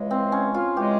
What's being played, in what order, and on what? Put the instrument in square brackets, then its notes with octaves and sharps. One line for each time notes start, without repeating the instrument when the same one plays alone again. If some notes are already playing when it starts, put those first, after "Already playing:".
Already playing: [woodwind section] C#2 C#3 E3 G#3
[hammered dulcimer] C4
C#4
F4
[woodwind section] C#3 E3 G#3 [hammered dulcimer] G4